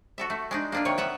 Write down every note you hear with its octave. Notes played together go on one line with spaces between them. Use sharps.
F#4 A4 E5
A3
G#3 D4 D#4
A#3 D4 F4
C3 D#3 C#5
B3 E5 F#5